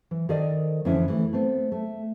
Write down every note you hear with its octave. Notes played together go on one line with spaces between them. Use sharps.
E3
D#3 A4 A#4 C5 D5 D#5
F2 D3 E3 C#4 E4
E3 A3
A3 B3 C4
A3